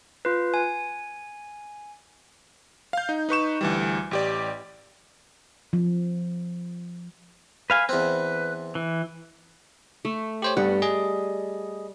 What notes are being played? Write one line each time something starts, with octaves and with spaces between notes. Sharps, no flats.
F4 B4
G#5
F5 G6
D#4
D#4 B4 C#6 E7
D2 E3 G3
A1 G4 D5
F3
B4 F5 G#5
E2 C4 B4
E3
A3
G4 C5 C#5
G2 G3 B3 F#5
G#4 D#5